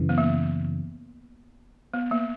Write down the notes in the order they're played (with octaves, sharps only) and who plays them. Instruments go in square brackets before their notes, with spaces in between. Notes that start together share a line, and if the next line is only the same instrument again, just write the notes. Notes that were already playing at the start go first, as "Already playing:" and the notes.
Already playing: [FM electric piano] F#2 C#3 E3
[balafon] B3
A#3
B3
A#3